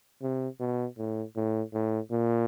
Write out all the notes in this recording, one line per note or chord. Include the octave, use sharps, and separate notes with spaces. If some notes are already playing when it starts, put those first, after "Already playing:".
C3
B2
A2
A2
A2
A#2